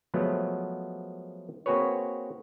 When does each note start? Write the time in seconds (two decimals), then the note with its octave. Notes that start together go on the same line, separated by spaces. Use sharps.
0.14 F3 F#3 G#3 A3 B3
1.66 A#3 C4 F#4 G#4 B4 C#5